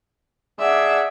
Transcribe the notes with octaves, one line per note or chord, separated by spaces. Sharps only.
D4 G#4 D5 E5 F#5